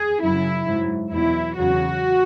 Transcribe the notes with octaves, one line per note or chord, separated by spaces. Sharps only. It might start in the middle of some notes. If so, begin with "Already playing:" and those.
Already playing: G#4
F#2 C#3 F#3 E4
G#2 F#3
E2 B2 F#3 E4
E2 C#3 F#3 F#4